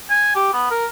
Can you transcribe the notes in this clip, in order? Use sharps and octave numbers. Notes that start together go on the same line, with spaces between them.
G#5
G4
B3
A#4